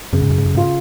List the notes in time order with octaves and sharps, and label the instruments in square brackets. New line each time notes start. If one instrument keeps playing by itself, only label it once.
[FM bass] F#2 [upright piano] C#3
[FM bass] G#2
F#2
G#2
F#2
[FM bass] G#2 [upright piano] F4